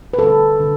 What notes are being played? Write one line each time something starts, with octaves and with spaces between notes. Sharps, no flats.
B4
D3 G3 C4 A4
D3